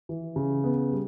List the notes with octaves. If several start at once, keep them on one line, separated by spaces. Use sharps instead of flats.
E3
C#3
B3
G3